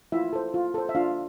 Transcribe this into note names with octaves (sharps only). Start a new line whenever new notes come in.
E4 F4 E5
A4 C5
F4
A4 C5
E5
D4 F4 F5